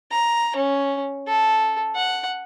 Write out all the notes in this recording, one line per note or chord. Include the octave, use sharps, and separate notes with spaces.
A#5
C#4
A4
F#5